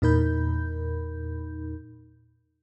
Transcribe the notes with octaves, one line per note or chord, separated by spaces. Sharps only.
E2 A#2 D#4 A#4 B5 G6